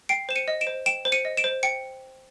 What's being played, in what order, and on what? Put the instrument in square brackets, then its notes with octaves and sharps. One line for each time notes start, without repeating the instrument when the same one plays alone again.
[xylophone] G5 C7 D7
C5 E7
C#7 D#7
D#5
D7 E7
C5
G5 D7 E7
C5
C#7 D#7
D#5
D7 E7
C5
G5 C#7